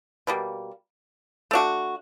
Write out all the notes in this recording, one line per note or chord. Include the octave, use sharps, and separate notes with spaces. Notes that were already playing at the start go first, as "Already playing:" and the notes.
B2 G3 A#3
A3 D4 F#4